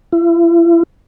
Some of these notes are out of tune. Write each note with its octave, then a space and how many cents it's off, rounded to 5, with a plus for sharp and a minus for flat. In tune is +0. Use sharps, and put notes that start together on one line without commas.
E4 +40